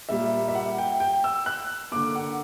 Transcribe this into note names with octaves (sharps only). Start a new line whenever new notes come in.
A#2 G3 A#3 E5
E5
F#5
G5
G5
E6
F#6
D3 A#3 D6
F#5